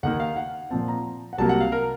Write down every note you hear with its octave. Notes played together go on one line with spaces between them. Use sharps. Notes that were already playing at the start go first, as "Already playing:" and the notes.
D#2 D#3 A#3 F#5
F5
F#5
A#2 F3 C4 A5
A#5
F#5
C2 C3 F#3 A#3 A5
F#5
F5
A#4